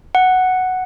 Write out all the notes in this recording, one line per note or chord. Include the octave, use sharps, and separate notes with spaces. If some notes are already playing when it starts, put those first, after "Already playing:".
F#5